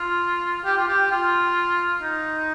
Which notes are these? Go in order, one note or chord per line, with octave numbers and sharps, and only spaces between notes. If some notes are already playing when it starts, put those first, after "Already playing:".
Already playing: F4
G4
F4
G4
F4
D#4